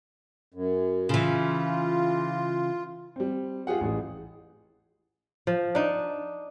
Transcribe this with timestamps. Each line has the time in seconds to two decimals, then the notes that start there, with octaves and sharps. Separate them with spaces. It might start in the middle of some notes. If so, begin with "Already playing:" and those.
0.54 F#2
1.09 C#3 E3 F4
3.16 G3 C4
3.67 F4 G4 G#4 F#5
3.81 A1 G#4
5.47 F3
5.75 D4 D#4